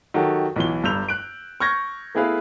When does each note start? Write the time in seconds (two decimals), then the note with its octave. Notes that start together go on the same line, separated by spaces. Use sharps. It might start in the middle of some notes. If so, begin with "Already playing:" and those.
0.14 D#3 F#3 F#4 G4 A4
0.56 B1 E3 G7
0.83 G1 G2 E6 G6 F7
1.09 F#6 D7
1.60 C#6 F6 G6 G#6 A#6
2.15 A3 B3 E4 G#4 B4 F5